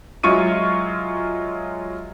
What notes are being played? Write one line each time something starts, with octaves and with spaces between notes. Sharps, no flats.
F#3 G#3 E4 F4 C#6 D#7